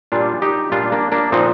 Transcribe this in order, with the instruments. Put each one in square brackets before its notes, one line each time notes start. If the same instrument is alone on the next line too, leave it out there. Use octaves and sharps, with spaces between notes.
[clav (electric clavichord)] A#2 G3 D4 F4
D#4 G4
A#2 G3 D4 F4
A#3 D4
A#3 D4
A#2 F3 C4 D#4